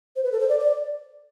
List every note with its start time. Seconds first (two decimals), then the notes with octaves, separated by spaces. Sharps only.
0.16 C5
0.24 B4
0.32 A4
0.40 C5
0.49 D5
0.60 D5